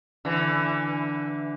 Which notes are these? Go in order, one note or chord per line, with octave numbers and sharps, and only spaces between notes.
D3 E3